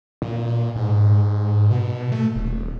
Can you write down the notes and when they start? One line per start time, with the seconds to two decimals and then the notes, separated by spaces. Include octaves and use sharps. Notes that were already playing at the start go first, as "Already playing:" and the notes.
0.22 A#2
0.76 G#2
1.71 B2
2.12 A3
2.36 D#1